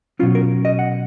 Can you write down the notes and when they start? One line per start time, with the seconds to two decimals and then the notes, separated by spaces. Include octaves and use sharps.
0.19 B2 F#3 C#4 F4
0.35 A#4
0.65 D#5
0.79 F#5